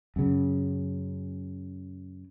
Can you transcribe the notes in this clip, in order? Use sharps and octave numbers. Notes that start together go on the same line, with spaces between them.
F#2 C#3